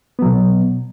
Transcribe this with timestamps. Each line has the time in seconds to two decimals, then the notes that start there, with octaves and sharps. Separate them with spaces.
0.19 B3
0.22 F#3
0.26 B2